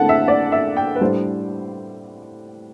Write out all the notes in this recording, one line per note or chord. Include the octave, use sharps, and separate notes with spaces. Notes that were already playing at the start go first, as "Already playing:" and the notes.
Already playing: D3 A3 C4 E4 F#5 A5
E5
D5
E5
G5
B4
A2 G3 D4 C5